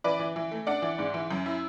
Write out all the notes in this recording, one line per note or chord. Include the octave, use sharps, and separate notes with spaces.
E3 B4 D5
E3
E3
A3
D4 D5 F#5
E3
G#2
E3
F#2
E4